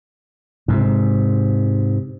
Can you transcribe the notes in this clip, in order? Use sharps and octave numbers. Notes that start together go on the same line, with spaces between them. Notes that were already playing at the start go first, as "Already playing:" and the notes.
G#2 C3